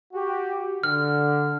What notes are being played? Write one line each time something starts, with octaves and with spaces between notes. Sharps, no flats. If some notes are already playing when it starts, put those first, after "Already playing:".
F#4 G4
D3 F6